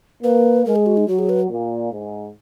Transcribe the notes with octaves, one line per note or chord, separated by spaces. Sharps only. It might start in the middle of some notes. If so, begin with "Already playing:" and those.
A#3 B4
G#3 A#4
G#4
F#4
D#4
F#3 F#4
G#4
B4
A#2
G#2